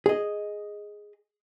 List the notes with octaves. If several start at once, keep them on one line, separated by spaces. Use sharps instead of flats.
G#4 D#5